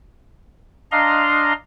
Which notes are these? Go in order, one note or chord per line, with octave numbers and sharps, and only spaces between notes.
D4 D#5 F5 A#5 C6